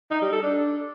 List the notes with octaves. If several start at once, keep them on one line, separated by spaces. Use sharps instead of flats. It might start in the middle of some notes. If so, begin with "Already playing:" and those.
D#4
G3
A4
D4